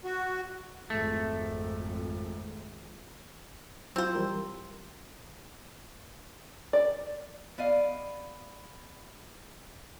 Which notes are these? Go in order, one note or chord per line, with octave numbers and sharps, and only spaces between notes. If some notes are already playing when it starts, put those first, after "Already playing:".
F#4
G#1 F2 A3
F#3 C4 E4 F4 C5
E3 G3 A#4
D5
B3 D5 D#5 F5